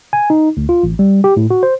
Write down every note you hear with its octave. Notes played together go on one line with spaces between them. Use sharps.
G#5
D#4
D2
F4
A1
G3
G4
A2
F#4
C5